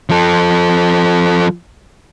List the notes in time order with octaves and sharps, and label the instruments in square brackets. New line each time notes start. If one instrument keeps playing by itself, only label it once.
[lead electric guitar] F3 A4